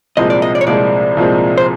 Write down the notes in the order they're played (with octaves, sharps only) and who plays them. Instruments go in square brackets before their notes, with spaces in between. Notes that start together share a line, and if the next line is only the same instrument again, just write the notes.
[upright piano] C2 A#2 F3 G#3 C4 [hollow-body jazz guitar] D#5
[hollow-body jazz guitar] D5
D#5
D5
C#5
[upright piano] C2 A#2 F3 G#3 C4 [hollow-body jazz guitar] D5
[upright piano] C2 A#2 F3 G#3 C4
[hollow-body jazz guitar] C5